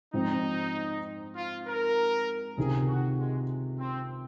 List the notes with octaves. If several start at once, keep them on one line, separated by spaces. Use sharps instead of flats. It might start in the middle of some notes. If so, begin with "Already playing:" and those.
G#2 F3 C4 D#4
F4
A#4
C#2 C3 D#3 G#4
F#4
G#3
C4